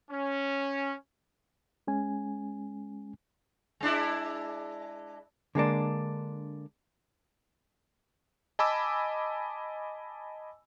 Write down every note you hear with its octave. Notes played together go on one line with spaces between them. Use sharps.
C#4
G#3 C#4 G#5
G#3 D4 E4
D3 G#3 A#3 D4
D#5 G#5 A5 B5 D6 E6